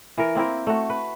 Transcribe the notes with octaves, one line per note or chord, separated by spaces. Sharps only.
E3 A#4
A#3 C4 E4 A#4
A3 F#4
B4